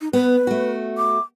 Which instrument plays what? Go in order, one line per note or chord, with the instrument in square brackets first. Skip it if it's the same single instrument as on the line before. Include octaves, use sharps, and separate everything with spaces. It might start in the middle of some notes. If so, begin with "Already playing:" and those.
[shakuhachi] D#4
[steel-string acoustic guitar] B3 [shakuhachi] B4
[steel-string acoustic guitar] A3 F#4
[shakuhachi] D6